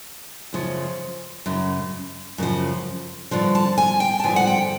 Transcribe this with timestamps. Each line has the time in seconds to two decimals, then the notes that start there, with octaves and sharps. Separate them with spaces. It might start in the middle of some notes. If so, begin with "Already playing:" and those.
0.53 F#2 C#3 F3
1.46 F#2 C#3
2.38 F#2 C#3 F3
3.31 G2 D3 F3
3.55 A5
3.78 G#5
4.00 G5
4.20 A5
4.24 G2 D3 F3 G#5
4.36 F#5
4.47 G5